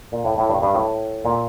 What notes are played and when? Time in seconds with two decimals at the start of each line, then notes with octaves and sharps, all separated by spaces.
0.12 A#2
0.24 A2
0.38 A2
0.49 G2
0.62 G2
0.74 A2
1.25 A#2